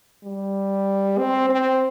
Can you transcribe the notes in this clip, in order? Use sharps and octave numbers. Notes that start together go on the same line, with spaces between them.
G3
C4
C4